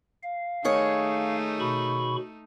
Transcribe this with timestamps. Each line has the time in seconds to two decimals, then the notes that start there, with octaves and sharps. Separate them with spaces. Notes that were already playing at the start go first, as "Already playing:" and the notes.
0.23 F5
0.65 D#3 A3 D#4 G#4 C#5
1.60 B2 B5 C#6